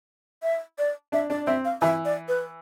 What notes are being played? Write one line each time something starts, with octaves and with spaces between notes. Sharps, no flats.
E5
D5
D4 E5
D4 D5
C4 E5
F5
E3 E5
D5
B4